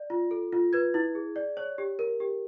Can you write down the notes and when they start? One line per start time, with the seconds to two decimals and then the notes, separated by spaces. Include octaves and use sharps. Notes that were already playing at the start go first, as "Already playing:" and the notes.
Already playing: D5
0.10 F4
0.31 A4
0.53 F4
0.73 B4 G#6
0.94 E4
1.15 G#4
1.36 D5
1.57 C#5
1.78 G4
1.99 A#4
2.20 G4